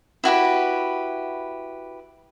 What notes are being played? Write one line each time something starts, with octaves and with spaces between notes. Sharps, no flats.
E4 F#4 G4 B4